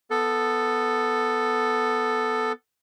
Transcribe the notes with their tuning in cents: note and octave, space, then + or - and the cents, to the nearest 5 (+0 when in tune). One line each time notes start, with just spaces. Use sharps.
B3 +0 A4 +0